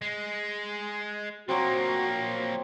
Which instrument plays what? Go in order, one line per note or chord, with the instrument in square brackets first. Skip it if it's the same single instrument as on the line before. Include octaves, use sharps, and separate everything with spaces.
[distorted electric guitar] G#3
[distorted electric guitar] F3 A#3 [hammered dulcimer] F#3 C4 [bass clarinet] F#4